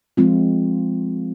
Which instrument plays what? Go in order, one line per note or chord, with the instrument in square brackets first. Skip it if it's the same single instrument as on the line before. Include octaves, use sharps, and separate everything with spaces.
[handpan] F3 G#3 C4 F4